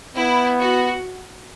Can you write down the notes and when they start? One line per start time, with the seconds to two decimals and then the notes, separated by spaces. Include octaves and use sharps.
0.16 B3 E4
0.59 F#4